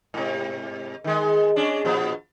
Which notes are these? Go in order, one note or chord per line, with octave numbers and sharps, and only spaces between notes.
G#2 C3
D#3 G#3
G#3 C#4 D4
A#2 F3 B3